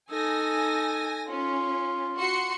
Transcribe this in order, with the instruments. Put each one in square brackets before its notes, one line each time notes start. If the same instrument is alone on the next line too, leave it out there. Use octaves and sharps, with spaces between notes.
[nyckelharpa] D#4 A4 [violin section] G#5 A#6
[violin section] C#4 [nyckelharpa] F4
[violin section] F#4 C6 C#7